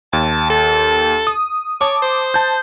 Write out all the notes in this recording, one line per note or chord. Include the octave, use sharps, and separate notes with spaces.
D#2 A5
A4
D#6
C#5 A5 D6
C5
A5 G6